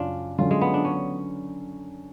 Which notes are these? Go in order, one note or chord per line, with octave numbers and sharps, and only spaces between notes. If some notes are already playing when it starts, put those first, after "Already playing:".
Already playing: F#2 C#3 C#4 D4 F4
D3 F#3 C#4 F4
G#3
B3
D4
C#4